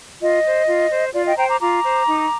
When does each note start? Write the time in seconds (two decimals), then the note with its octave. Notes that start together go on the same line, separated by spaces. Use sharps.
0.21 F4 D#5
0.45 C5
0.68 F4
0.92 C5
1.14 F4 D5
1.26 D#5 G5
1.37 C5 G5 A#5
1.48 A#5 D6
1.60 F4 A#5 D6
1.84 C5
2.07 D#4